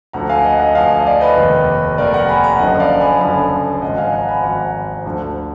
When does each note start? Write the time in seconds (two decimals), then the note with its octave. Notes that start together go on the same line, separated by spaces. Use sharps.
0.13 D2 D3 F3 F#5 A#5
0.30 F5 G#5
0.44 D#5 F#5
0.59 D#5 F#5
0.75 D2 D3 F3 F5 G#5
0.99 D#5
1.06 D5 F5
1.21 B4 D#5
1.37 F1 D#2 D#3
1.98 F1 D#2 D#3 A#4 D5
2.13 F#5 A#5
2.28 G#5 B5
2.44 F#5 A#5
2.59 F#1 F#2 D3 F3 D#5 F#5
2.79 D5 F5
3.00 G#5 B5
3.21 F#1 F#2 D3 F3 G#5 B5
3.82 G#1 G#2 F3 D#5 F#5
3.98 F5 G#5
4.13 F#5 A#5
4.29 G#5 B5
4.43 G#1 G#2 F3 F#5 A#5
5.06 D2 D3 F3